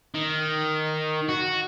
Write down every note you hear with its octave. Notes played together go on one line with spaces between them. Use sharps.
D#3
F#4